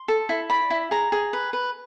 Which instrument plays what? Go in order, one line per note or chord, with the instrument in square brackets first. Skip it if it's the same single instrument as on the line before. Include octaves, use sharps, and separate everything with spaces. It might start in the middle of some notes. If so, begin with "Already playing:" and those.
Already playing: [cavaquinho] C6
A4
E4
D5 B5
E4
G#4 A#5
G#4
B4
B4